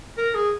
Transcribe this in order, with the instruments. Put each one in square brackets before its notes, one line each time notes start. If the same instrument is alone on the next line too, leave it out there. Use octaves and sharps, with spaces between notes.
[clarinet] A#4
G#4